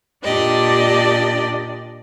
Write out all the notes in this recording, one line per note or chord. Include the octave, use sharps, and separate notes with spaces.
A#2 D4 G4 D5 D#5